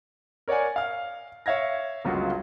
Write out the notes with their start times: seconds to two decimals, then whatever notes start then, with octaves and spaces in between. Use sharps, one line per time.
0.48 A#4 C#5 D5 F#5 G#5
0.76 F5 F6
1.46 C#5 E5 F5 G#6 A#6
2.05 G1 C#2 F#2 F4 F#4